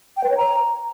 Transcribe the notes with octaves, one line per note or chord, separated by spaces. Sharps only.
G5
B4
C#5
A#5